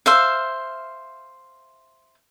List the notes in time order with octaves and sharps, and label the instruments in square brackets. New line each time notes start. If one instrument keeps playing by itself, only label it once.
[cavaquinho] C5 E5 F5